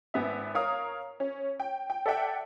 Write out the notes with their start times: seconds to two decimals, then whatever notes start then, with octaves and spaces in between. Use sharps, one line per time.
0.14 G#1 B3 E5
0.55 A#4 C#5 F5 A#5 D#6
1.20 C#4
1.60 G5
1.90 G5
2.06 A4 D5 E5 F#5 G5